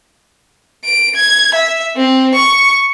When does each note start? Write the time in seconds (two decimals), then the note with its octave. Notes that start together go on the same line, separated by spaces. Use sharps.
0.84 D7
1.15 G#6
1.54 E5
1.96 C4
2.34 C#6